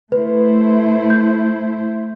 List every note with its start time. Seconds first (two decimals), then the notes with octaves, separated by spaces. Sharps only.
0.12 A3 E4 B4 C5
1.10 G6